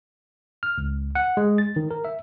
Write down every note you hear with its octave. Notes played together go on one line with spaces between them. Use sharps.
F6
C#2
F#5
G#3
A6
D#3
A#4
E5